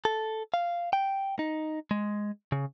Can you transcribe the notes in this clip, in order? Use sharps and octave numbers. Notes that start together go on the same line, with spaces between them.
A4
F5
G5
D#4
G#3
C#3